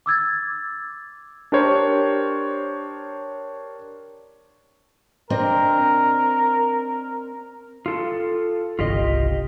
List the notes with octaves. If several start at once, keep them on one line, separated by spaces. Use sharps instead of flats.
D6 E6 G#6 A6
D4 G4 A#4 C5 C#5
C4 D4 A#4 D#5
F4 A4
G1 C2 F4 G4 D#5